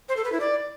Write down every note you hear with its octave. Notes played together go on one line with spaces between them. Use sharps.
C5
A4
B4
E4
D5